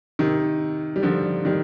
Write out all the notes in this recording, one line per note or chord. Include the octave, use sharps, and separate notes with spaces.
C3 D#3
G3
D3 F3
D#3 G3